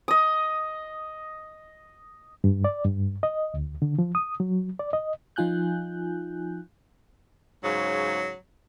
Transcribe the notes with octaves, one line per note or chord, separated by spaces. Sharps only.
D#5 D#6
G2
D5
G2
D#5
D2
D3
F3
D#6
F#3
D5
D#5
F3 D#4 F4 G#5 F#6 G6
G#2 C#3 F#3